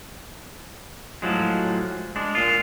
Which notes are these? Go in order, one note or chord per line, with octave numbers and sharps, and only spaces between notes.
A2 F3 F#3 G#3
G#3 D4
A#2 F4